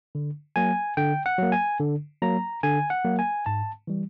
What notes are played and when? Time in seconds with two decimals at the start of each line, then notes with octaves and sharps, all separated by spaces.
0.15 D3
0.56 F#3 A#3 G#5
0.97 D3 G5
1.26 F#5
1.38 F#3 A#3
1.52 G#5
1.80 D3
2.22 F#3 A#3 A#5
2.63 D3 G#5
2.90 F#5
3.04 F#3 A#3
3.19 G#5
3.46 G#2 A5
3.87 E3 G3